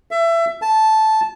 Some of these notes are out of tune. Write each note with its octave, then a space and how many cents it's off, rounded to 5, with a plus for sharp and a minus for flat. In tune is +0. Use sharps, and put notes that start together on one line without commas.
E5 +25
A5 -10